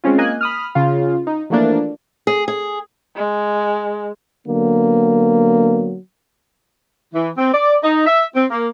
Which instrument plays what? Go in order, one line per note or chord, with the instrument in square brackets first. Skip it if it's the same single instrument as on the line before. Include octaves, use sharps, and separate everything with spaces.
[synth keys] G#3 C4 C#4 F4
A#3 D#5 G#5 F#6
B5 D#6 F6
C#3 F4
D#4
E3 F3 A3 A#3 D4
[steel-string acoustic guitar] G#4
G#4
[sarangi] G#3
[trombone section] D3 F#3 A#3 B3
[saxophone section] E3
C4
D5
D#4
E5
C4
A#3